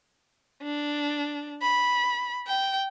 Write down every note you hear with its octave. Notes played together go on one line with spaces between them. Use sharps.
D4
B5
G5